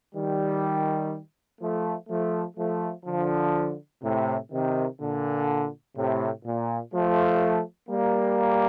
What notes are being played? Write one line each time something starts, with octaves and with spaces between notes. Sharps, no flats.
D#3 G3
F3 A3
F3 A3
F3 A3
D3 F3
A2 C3
C3 D#3
A#2 D3
A2 C3
A#2
F3 A3
G3 A#3